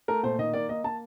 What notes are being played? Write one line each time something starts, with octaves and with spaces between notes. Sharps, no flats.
A3 A#4
A#2 C5
D#3 D#5
A#3 D5
A#3 D#5
A#3 A5